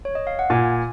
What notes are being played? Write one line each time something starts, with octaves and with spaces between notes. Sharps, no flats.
C#5
D#5
F5
F#5
A#2 G#5